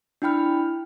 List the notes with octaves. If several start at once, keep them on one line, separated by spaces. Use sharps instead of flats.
D4 E4 G5 B5 F6